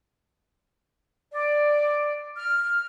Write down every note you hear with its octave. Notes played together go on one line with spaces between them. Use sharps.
D5
F6